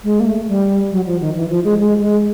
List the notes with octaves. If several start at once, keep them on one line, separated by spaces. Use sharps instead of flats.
G#3
A#3
A3
G3
F#3
F3
D#3
E3
F3
G#3
G#3
G#3